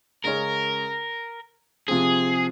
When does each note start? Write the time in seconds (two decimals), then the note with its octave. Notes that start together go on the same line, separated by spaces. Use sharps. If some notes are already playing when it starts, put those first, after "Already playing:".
0.24 C#3 G#3 C#4 G#4 A#4 C#5
1.88 C3 F3 C4 G#4